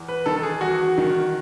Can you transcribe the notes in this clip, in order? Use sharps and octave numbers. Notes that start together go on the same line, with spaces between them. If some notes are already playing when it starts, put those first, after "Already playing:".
Already playing: E2
B4
D#3 A4
A4
G#4
E2 F#4
D#3